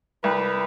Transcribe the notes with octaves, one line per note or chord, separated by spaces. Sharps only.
C2 B4